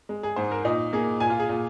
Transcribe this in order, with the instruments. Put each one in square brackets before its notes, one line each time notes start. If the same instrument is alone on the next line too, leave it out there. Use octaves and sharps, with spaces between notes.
[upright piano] G#3
G#4
G#2 C5
A#4
A#2 D#4
A#3 G#4
A#2 G#5
F4
G#4
A#2